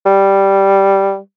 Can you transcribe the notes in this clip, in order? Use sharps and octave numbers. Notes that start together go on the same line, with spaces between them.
G3